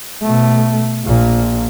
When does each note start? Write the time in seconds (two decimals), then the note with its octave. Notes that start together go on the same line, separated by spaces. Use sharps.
0.23 B2 A3
1.05 A#1 A#2